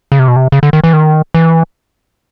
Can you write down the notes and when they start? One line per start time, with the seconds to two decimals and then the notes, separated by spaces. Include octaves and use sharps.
0.12 C#3
0.19 C3
0.28 B2
0.36 C3
0.52 C#3
0.63 D3
0.73 D#3
0.84 E3
0.93 D#3
1.34 E3